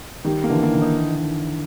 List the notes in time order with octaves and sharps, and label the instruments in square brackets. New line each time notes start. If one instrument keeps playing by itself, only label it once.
[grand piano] D#3 [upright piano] G3
[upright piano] A#3
[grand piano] D3 E3
[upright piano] A#3
[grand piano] D#3
D3
[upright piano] D#4